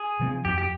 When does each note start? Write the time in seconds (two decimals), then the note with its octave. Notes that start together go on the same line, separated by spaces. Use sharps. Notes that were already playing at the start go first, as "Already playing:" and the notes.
Already playing: G#4
0.20 C3 F3 C4
0.45 F2 G4
0.58 G4